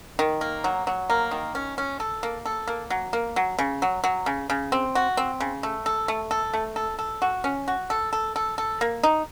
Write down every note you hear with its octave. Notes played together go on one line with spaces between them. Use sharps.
D#3
A#3
F#3
F#3
A#3
D#3
C#4
C#4
A4
A#3
A4
A#3
F#3
A#3
F#3
C#3
F#3
F#3
C#3
C#3
C4
F#4
C4
C#3
A3
A4
A3
A4
A3
A4
A4
F#4
C#4
F#4
A4
A4
A4
A4
A#3
D#4